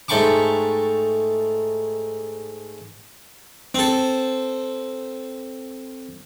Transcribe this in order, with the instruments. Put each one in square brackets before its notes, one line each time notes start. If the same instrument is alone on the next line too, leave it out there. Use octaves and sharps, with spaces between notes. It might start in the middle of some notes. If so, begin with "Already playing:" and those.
[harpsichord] G#2 A3 G5 B5 C#6 D6
C4 A4